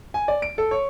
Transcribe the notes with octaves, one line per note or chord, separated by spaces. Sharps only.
G#5
D5
D7
A4
C#5